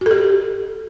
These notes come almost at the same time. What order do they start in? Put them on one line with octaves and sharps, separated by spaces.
F#4 A4 G4